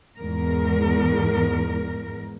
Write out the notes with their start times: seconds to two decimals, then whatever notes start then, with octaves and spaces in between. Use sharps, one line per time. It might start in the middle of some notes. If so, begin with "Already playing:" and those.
0.18 E2 G#2 A#4